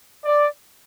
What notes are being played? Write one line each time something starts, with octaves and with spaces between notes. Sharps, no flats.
D5